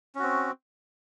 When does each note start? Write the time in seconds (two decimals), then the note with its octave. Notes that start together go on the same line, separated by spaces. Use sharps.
0.15 C#4
0.19 F#4
0.23 C4